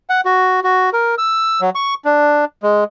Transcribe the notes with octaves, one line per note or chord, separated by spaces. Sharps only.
F#5
F#4
F#4
A#4
E6
F#3
C#6
D4
G#3